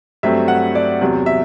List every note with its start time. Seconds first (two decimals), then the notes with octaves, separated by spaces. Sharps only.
0.23 G2 F#3 A3 C4 E5
0.48 F#5
0.75 D5
1.01 E2 C3 F#3
1.26 E5